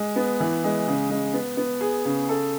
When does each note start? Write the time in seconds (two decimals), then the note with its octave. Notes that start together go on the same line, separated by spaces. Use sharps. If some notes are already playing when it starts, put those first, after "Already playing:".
Already playing: G#3
0.16 B3
0.40 E3
0.64 G#3
0.88 C#3
1.10 G#3
1.34 B3
1.57 B3
1.81 G#4
2.05 C#3
2.29 A4